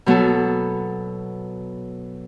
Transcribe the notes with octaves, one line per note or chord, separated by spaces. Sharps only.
B2 F#3 B3 F#4 A4